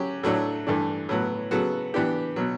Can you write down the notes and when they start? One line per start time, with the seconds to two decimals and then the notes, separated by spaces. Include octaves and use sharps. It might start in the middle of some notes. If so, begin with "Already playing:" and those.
Already playing: F#3 C#4 G4
0.23 A2 F#3 A3 D4 A4
0.67 G2 E3 A3 D4
1.09 A2 F#3 B3
1.51 C#3 F#3 B3 F#4 A4
1.94 E3 B3 D4 G4
2.36 B2 F#3